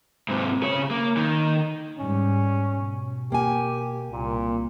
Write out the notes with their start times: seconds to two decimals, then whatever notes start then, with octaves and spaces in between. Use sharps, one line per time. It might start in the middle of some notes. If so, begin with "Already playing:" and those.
0.28 G#2 C3
0.63 C#3 C#5
0.91 A#3
1.17 D#3
1.99 G#2 G3 C#4
2.72 B2
3.32 A#3 G4 G#5
4.12 C2 A#2